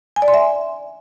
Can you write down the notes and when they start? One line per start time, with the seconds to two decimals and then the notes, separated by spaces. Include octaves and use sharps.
0.16 G#5
0.22 D5
0.28 C6
0.34 E5